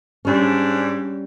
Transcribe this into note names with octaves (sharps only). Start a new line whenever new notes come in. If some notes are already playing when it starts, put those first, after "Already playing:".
G#2 G3 C#4 D4